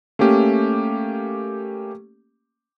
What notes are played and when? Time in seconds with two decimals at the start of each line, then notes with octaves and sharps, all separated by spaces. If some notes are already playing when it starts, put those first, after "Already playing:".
0.19 A3 A#3 C#4 G4